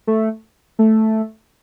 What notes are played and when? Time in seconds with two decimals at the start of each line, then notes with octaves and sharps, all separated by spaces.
0.07 A3
0.79 A3